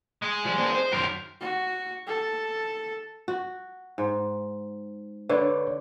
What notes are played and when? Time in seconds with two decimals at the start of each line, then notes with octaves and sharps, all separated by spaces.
0.22 G#3 G#4
0.45 F3 G3
0.58 A#3 C4 D4
0.74 C5
0.93 F#2 D#3 A#4 C5
1.41 F#4
2.07 A4
3.28 F#4
3.98 G#2
5.29 D3 B4 C#5 D5